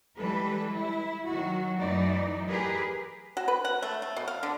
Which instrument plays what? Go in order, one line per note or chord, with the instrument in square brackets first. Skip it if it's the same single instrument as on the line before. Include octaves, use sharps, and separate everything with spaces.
[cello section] E3 G3 G#3 A4 B4
E4
D#3 F#3 F#4
F#2 E3 F#3 A3 D#4 D5
G4 G#4 A#4 B4
[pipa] F#4
B4
F#5
A3
A3
B2
F5
D3